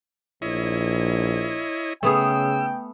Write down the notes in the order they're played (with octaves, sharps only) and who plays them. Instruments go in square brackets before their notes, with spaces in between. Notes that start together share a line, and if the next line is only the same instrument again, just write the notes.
[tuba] A#1 [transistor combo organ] E4 C#5 D#5
[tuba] C#3 [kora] A3 B3 G#4 [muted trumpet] G5 [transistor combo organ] E6